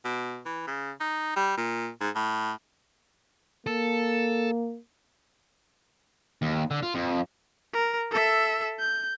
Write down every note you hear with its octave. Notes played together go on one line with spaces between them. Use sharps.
B2
E3
C#3
D#4
G3
A#2
G#2
A2
A#3 A4
D#2
D3
F4
F2
A#4
A4 E5
G6